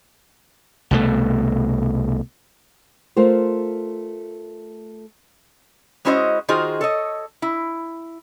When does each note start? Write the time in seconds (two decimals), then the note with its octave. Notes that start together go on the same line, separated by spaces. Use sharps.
0.91 C2 B2 A3
3.16 A3 F4 A#4 C5
6.05 G#3 C#4 E4 F#4 C5 D#5
6.49 D#3 D#4 F4 F#4 G#4 C5
6.81 A4 C#5 D#5
7.42 E4